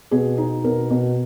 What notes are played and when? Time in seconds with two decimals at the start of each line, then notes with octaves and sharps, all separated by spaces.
0.11 B2 G#4
0.38 D#4
0.64 B2 A#4
0.90 B2